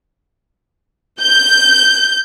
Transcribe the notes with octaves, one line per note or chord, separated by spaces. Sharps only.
G6